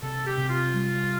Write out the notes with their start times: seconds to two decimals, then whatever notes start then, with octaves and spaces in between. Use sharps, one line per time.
0.02 C3 A4
0.26 G4
0.38 C3
0.49 F4
0.73 G3